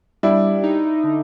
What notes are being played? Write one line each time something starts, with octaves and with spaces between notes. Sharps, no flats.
G3 D4 E4
D#4
D3